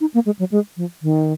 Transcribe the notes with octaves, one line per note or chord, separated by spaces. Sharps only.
D#4
A#3
G#3
F#3
G#3
F3
D#3